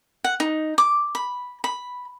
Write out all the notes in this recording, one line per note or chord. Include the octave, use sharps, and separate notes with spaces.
F#5
D#4
D6
B5
B5